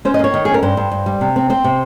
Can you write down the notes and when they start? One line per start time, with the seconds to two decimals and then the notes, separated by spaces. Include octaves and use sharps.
0.05 C#4 C5
0.14 D#5
0.19 A#3 C#5
0.34 D#3
0.45 C#4 G#4
0.54 A#4
0.63 G2 C5
0.77 G2
0.91 G2
1.06 G3
1.21 C3
1.36 C4
1.50 C4 C5
1.64 C3